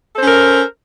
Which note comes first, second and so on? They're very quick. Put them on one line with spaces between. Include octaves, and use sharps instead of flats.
A4 C5 C#4 A#4